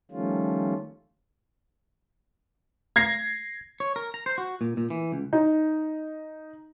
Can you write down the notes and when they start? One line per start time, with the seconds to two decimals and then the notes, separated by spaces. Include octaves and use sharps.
0.11 D#3 F3 G3 A3 C#4 F4
2.96 G#6 A#6 C7
3.80 C#5
3.96 A#4
4.14 A#5
4.26 C5
4.38 F#4
4.61 A#2
4.77 A#2
4.90 E3
5.12 C#2
5.33 D#4